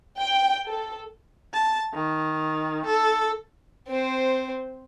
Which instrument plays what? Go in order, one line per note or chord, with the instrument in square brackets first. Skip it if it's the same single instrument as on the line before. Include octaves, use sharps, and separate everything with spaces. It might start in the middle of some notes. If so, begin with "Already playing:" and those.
[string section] G5
A4
[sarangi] A5
D#3
A4
[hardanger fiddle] C4 C5